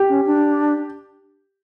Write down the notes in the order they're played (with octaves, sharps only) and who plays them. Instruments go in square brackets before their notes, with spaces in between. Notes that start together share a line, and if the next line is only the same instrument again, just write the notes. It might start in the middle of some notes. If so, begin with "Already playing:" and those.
Already playing: [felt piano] G4
[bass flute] C#4
D4